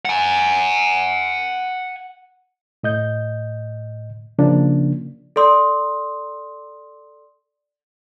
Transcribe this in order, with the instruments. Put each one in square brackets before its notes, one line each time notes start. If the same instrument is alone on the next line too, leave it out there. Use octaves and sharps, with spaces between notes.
[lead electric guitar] F#5 G#5
[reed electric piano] A2 D#5 G6
C#3 F3 A#3 D4
[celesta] A4 D5 C6 D#6